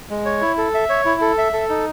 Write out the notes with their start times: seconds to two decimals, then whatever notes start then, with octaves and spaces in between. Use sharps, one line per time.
0.10 G#3
0.26 C#5
0.41 E4
0.57 A4
0.74 E5
0.89 C#5
1.05 E4
1.21 A4
1.38 E5
1.53 A4
1.69 D#4